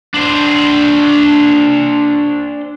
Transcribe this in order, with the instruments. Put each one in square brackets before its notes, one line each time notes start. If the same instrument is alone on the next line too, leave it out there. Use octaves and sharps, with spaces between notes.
[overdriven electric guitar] D4 C5